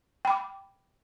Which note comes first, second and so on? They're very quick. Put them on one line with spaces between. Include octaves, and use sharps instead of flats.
G5 B5 D6